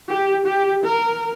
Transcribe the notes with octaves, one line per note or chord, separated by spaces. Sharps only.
G4
G4
A#4